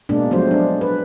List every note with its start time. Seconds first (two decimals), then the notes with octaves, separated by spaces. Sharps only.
0.09 B2 G#3 A#3 D4
0.31 F3 F#3 G#3 A3 C5
0.51 D4
0.81 B4